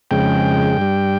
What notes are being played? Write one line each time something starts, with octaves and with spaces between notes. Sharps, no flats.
F2 C#3 G#3 G5
G2 G3